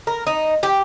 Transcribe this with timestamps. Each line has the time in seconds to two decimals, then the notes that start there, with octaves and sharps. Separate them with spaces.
0.07 A#4
0.27 D#4
0.63 G4